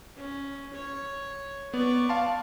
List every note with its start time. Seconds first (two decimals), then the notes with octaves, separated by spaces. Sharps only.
0.17 C#4
0.74 C#5
1.74 B3 D5 C#6
2.09 F5 A5 C6